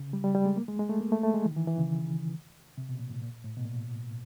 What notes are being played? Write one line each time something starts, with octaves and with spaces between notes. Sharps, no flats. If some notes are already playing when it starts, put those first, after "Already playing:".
Already playing: C#3
G3
G3
G3
G#3
A#3
G#3
G#3
A3
A#3
A3
A3
G#3
E3
D#3
E3
E3
C#3
C3
B2
A#2
A2
A#2
A2
B2
A#2